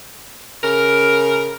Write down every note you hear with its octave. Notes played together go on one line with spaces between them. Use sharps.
C#3 A#4